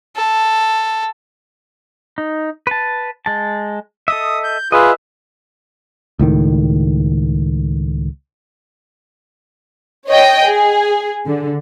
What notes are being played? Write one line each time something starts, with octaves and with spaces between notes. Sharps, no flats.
A4
D#4
B4 A5
G#3 A5
A4 D#5 E5 D#6
G6
F4 G#4 B4 D#5 E5
C#2 A2 D#3
C#5 D#5 G5
G#4
D3